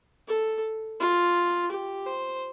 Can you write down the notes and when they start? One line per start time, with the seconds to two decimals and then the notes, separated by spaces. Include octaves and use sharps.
0.28 A4
1.00 F4
1.72 G4
2.06 C5